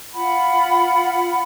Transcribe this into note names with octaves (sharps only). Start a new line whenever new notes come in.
F4 F#5 B5